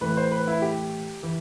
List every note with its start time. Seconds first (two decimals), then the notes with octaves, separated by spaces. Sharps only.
0.01 A2 E3 B4
0.17 C5
0.31 B4
0.47 E4
0.62 G4
1.23 E3